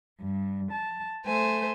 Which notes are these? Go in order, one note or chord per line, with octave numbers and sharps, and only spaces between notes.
G2
A5
A3 C5 G#5